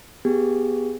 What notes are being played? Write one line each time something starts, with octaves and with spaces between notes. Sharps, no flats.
B3 G4 G#4